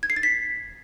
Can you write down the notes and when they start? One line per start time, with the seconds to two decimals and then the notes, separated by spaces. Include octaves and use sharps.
0.03 G#6
0.10 C7
0.16 A6
0.23 B6